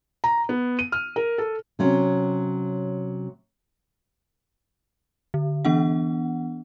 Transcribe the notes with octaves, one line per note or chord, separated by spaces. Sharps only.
A#5
B3
D#7
F6
A#4
A4
C3 F#3 C4 C#4
D3
E3 B3 D4 F#5